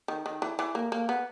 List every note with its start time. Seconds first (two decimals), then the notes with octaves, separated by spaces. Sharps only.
0.08 D#3
0.26 D#3
0.42 E3
0.59 E3
0.75 A#3
0.92 A#3
1.09 B3